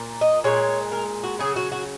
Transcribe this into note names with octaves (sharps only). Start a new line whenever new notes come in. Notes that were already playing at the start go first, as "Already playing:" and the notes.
Already playing: A#2
D#5
A#2 G#3 C#5
A#4
F#4
C#3 F#3 G#4
F#4
F#4